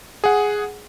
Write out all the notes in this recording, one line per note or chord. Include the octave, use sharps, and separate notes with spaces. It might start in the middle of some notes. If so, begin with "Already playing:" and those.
G#4 F#5